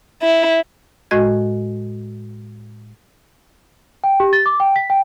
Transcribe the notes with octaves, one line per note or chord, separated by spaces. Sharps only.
E4
A2 G#3 F#4 D#5 G#6
G5
G4
A6
D6
G5
B6
G5